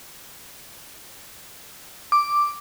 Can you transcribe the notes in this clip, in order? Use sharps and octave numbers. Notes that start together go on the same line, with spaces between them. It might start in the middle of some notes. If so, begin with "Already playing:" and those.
D6